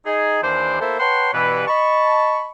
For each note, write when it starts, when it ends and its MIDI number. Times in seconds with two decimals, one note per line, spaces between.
0.06 0.38 63
0.06 0.38 68
0.42 0.80 39
0.42 0.80 52
0.42 0.80 62
0.42 0.80 72
0.80 0.98 57
0.80 0.98 58
0.80 0.98 64
0.80 0.98 69
0.80 0.98 72
0.99 1.33 71
0.99 1.33 73
0.99 1.33 78
0.99 1.33 79
0.99 1.33 81
0.99 1.33 84
1.33 1.67 43
1.33 1.67 47
1.33 1.67 52
1.33 1.67 71
1.67 2.50 75
1.67 2.50 81
1.67 2.50 83
1.67 2.50 85